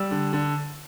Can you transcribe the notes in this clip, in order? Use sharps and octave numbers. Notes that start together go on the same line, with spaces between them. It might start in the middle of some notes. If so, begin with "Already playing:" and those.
Already playing: G3 E6
D3
D3